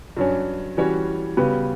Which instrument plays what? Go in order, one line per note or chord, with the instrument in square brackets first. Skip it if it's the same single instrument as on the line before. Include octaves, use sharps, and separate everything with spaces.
[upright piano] G2 F#3 C#4
E3 G3 C#4 F#4 C#5
C#3 G3 B3 F#4 B4